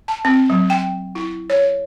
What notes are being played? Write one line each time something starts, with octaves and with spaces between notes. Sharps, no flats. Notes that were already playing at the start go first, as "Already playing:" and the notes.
A5
C4
F#3
G5
E4
C#5